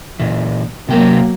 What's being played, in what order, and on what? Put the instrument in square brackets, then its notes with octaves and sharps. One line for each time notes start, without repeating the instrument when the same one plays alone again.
[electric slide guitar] A#2 E3
[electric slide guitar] C3 G5 A#5 [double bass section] F#3 A#3